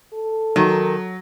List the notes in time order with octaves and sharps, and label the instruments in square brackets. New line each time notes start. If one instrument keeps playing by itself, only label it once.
[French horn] A4
[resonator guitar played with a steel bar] D#3 [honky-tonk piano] F#3